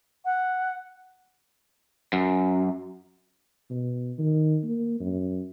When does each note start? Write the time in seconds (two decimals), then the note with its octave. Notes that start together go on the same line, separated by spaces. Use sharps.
0.25 F#5
2.13 F#2
3.70 B2
4.19 D#3
4.63 A#3
5.00 F#2